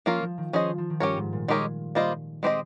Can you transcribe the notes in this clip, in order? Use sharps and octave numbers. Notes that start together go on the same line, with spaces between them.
F3 A#3 C#4 F4 A#4
F3
D#3
F3 C#4 G#4 C5 D#5
F3
D#3
G2 C#4 G4 A#4 C#5
G#2
A#2
G#3 D#4 G4 A#4 C#5
G3 A#3 F4 C5 D#5
G#3 C4 G4 C5 D#5